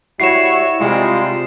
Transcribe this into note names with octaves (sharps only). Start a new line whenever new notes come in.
G3 E4 F#4 C#5 C7 E7
C3 G3 G#3 F4